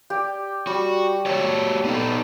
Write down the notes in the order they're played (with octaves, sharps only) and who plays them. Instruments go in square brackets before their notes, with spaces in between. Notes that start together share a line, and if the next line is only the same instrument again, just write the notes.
[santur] G4 D5
[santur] G3 [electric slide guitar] F#4
[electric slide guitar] F#4 G4 C#5 [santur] A5
[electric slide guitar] B3 D#4 A4